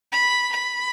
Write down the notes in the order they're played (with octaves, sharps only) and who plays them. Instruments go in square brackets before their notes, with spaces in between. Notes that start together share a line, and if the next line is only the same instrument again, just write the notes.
[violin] B5
B5